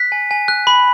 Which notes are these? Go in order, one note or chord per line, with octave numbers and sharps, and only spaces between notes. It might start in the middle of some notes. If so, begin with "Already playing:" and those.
Already playing: F#6 B6
G#5
G#5
F#6
B5